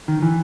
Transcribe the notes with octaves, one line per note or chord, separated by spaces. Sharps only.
D#3
E3